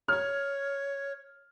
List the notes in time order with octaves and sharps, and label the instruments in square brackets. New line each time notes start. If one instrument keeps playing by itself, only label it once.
[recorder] C#5 [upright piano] F6 G#6